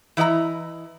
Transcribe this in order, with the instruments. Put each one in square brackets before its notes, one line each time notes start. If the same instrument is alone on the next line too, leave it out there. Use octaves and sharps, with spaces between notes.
[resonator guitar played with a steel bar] E3 E4 D#5 E5 A#5